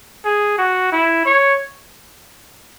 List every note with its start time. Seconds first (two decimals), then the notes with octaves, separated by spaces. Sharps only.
0.25 G#4
0.58 F#4
0.92 E4
1.26 C#5